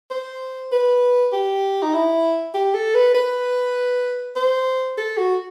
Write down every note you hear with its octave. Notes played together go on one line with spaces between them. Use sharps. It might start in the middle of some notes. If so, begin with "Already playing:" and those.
C5
B4
G4
D#4
E4
G4
A4
B4
B4
C5
A4
F#4